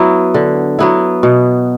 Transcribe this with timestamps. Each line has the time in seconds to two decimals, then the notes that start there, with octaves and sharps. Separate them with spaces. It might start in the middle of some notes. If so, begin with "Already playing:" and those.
Already playing: F#3 B3 E4
0.34 D3
0.79 F#3 B3 E4
1.23 B2